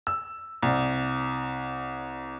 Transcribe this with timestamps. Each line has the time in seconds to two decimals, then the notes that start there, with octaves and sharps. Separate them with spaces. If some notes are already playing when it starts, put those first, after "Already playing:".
0.07 E6
0.63 C2